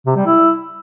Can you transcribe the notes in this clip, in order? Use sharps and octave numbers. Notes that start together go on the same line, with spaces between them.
C3
G3
E4